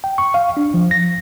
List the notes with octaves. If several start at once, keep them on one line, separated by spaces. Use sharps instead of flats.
G5
C#6
F5
D4
F3
A#6